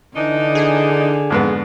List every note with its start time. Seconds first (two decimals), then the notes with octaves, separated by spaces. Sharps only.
0.16 D3 E3 D4 D#4
0.55 G#4
1.30 F2 G#2 B3